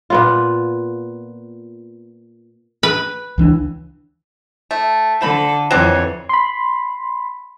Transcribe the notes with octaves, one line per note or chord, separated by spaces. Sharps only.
A#2 B3 F4
B4
C#2 E3 D4
A3
D3 F3 A3 A4 B5
F2 E3 F#3 C4 C#5 D5
B5 C6